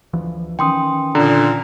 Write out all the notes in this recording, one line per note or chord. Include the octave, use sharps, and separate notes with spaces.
D2 E3 F3
D#3 E3 C#4 G5 C6 D#6
A#2 D3 A#5